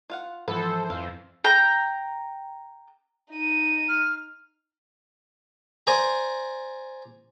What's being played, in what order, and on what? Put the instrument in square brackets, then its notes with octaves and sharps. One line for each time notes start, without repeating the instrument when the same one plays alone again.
[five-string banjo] F4 F5 F#5
[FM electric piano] G#2 F3 [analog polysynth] E3 C5 [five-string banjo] B3 B4 B5 [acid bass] A4
[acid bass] F2 [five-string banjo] F5 [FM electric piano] E6
[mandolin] G5 A#5
[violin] D#4 D#7
[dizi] F6
[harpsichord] C5 D5 G#5 A#5